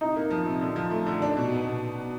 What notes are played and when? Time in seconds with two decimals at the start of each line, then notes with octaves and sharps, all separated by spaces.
0.01 C3 D#4
0.16 A#3
0.31 F3
0.46 C3
0.61 D3
0.76 F3
0.91 A3
1.06 D3
1.22 D4
1.37 B2
1.52 B3
1.67 B2